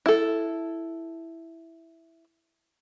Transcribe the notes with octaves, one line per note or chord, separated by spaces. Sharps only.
E4 A4